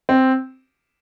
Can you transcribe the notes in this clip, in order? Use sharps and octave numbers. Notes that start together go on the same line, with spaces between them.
C4